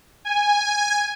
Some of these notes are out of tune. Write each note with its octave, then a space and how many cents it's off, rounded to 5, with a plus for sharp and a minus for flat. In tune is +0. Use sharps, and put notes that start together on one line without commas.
G#5 -10